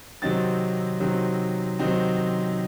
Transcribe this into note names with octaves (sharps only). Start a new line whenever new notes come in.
C3 D#3 F#3 C4 D#4 A6
C3 D#3 F#3 C4 D#4
C3 D#3 F#3 C4 D#4